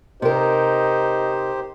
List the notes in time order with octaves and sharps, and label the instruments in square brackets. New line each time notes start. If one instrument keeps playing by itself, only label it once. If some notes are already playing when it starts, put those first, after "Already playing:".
[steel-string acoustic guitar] C3 A#4 [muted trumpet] D#4 [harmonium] G4 C5